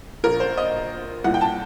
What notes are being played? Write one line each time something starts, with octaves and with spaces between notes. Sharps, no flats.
A#1 A#2 A#4
C5
D#5
C2 A#2 F#5
G5
A5